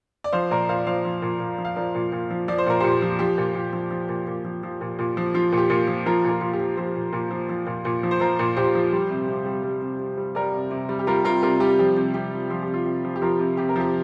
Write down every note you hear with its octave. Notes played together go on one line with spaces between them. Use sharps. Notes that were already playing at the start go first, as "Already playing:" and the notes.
D5
F3 C5 F5
A#2 A#4 D5
A#2 C5 F5
D5
F3 C5 F5
F3
A#2
A#2
F3
F5
F3 A#4 D5
A#2
A#2
F3
F3 D5
C5
A#2 A#4
A#2 G4 C5
F3
F3 G4
A#2
A#2
F3
F3
A#2
A#2
F3
F3
A#2
A#2
F3
F3 F4
A#2
G4
A#2
F3
F3 F4 A#4
A#2 F4 A#4
A#2
G4
F3
F3 G4 C5
A#2
A#2
F3
F3
A#2
A#2
F3
C5
F3 F4 A#4
A#2
A#2 G4 C5
F3
G3
C3
C3
G3
G3
C3
C3
G3
G3 A#4 D5
C3
C3
G3
G4
G3 F4 A#4
C3 F4 A#4
C3 F4 A#4
G3 G4
F3 G4
C3
C3 G4
F3
F3 F4
G4
C3
F4
C3
F3
G4
F3 F4 A#4
C3
C3 G4
A#4
F3 G4